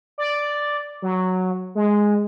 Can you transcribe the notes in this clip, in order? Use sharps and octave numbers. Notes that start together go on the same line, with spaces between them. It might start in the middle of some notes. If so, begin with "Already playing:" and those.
D5
F#3
G#3